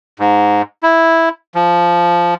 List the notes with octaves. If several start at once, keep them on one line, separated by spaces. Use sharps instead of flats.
G#2
E4
F3